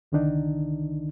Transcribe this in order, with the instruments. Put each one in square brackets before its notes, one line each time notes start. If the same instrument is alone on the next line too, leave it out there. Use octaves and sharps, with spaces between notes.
[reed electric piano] C2 D3 D#3 D4 D#4